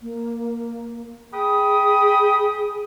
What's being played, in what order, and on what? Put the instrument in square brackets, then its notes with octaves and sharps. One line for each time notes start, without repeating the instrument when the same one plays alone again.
[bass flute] A#3
[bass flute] G#4 [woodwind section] G5 B5 D#6